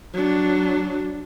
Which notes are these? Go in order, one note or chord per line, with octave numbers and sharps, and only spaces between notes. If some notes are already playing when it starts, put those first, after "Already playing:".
F#3 D4